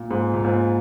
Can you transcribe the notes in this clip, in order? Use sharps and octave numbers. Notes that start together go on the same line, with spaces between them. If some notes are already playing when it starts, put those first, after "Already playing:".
Already playing: A#2
G#2
A#2
G#2